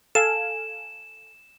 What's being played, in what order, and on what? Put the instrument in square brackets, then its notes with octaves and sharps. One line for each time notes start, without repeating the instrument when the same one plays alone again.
[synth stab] A4 F5 G#5 [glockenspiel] E7